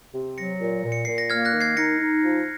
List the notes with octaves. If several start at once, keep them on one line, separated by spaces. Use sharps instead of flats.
C3
F#3 A#6 C#7
A#2
A#2
C#7
A#2 C7
A#6
A#3 F6 G#6
F#6 A#6
D#3
G#6 C7
D#4 A#6 C#7
D#4
F3